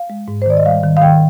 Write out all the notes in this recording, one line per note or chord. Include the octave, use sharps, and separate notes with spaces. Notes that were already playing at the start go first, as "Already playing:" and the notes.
Already playing: F5
G#3
G#2
C5
D#3 D5
D#5
G3 F5
D#3
F5
D#3 G5